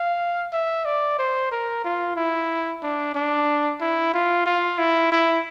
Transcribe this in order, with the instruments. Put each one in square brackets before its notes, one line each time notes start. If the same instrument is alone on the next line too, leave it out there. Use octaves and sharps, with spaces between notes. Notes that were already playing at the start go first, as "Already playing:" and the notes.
Already playing: [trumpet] F5
E5
D5
C5
A#4
F4
E4
D4
D4
E4
F4
F4
E4
E4